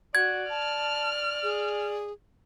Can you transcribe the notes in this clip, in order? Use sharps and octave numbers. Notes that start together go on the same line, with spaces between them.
F#4 D5 G#6
A5 F6
G#4